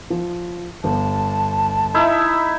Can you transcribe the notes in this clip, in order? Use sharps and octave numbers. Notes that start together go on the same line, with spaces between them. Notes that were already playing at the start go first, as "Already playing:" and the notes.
F3
G1 A5
D#4 E4 E5